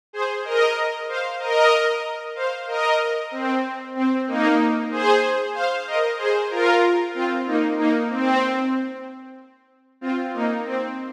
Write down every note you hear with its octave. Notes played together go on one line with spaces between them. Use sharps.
G#4 C5
A#4 D#5
C5 F5
A#4 D#5
C5 F5
A#4 D#5
C4
C4
A#3 D#4
G#4 C5
C5 F5
A#4 D#5
G#4 C5
F4 A#4
C4 F4
A#3 D#4
A#3 D#4
C4
C4 F4
A#3 D#4
C4